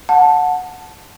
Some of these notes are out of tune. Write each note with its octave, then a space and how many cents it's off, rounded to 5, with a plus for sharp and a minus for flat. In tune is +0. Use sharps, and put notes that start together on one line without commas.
F#5 -20 A5 +0